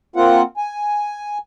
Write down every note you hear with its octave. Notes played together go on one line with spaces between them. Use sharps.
A#3 C4 F4 F#5
G#5